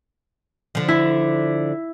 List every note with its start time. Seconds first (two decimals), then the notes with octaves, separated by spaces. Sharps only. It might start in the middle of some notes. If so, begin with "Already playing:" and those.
0.75 D3 F3
0.88 E4